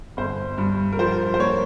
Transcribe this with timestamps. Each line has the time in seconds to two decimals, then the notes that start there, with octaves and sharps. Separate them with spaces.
0.17 G1 C5
0.58 G2
0.92 A#4
0.99 F3 C5
1.34 C5
1.39 A#3 C#5